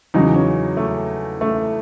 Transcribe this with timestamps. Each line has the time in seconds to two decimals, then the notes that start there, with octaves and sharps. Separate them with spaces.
0.14 E2 C#3 F#3 D#4
0.34 C#4
0.77 A3
1.41 A3